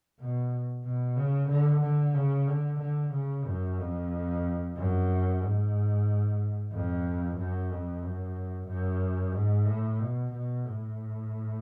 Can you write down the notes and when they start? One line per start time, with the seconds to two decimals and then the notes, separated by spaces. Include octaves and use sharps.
0.19 B2
0.84 B2
1.16 C#3
1.49 D3
1.82 D3
2.14 C#3
2.47 D3
2.80 D3
3.12 C#3
3.45 F#2
3.79 F2
4.76 F#2
5.41 G#2
6.72 F2
7.37 F#2
7.70 F2
8.02 F#2
8.68 F#2
9.33 G#2
9.65 A2
9.99 B2
10.32 B2
10.65 A2